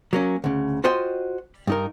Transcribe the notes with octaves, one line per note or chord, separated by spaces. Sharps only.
F#3 A#3 C#4
D2 C#3
F4 F#4 C5 D#5 G5
G2 D#4 A#4